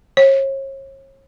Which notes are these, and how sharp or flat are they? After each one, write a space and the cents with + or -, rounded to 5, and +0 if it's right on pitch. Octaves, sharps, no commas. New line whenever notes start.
C#5 -40